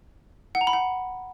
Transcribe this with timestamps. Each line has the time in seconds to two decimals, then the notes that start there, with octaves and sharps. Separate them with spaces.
0.55 F#5
0.61 A#5
0.67 B5
0.73 F#5